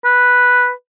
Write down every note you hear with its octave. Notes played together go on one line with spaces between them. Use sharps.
B4